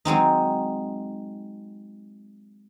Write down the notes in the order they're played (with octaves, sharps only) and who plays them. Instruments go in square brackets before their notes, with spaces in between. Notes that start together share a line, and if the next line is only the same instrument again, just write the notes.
[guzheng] F#3 G#3 C4 D#4